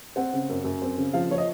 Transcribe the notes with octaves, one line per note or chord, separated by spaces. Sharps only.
C4 F#5
C#3
F#2
F#2
C4
C#3
F3 F5
F3 C#5
D#5